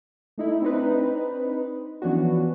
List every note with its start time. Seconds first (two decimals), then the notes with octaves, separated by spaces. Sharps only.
0.38 A3 D#4 E4
0.62 C4 D4 D#4 B4
2.02 E3 F3 B3 C#4 D4 F#4